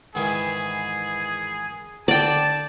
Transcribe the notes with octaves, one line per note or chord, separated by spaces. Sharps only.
G#2 D#3 E3 G#4
D3 D5 G5 A5